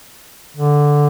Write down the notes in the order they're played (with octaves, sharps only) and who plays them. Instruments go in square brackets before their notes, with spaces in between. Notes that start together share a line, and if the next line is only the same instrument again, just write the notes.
[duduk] D3